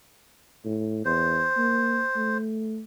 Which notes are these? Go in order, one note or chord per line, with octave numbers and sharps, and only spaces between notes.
A2
E2 C5
A#3
A3